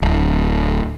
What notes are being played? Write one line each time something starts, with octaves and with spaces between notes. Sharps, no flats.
D1